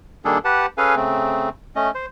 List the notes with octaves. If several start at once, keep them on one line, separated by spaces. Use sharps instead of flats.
D#3 G3 A#3 D4 G#4 A4
G4 B4 F#5 A5
C#4 G#4 A4 B4 F5 G#5
C#3 A3 C4
A3 C#4 D#5
C5